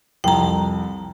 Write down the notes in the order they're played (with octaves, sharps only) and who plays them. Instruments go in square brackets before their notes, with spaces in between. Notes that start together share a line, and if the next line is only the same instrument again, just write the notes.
[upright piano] C2 F2 [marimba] G5 A#5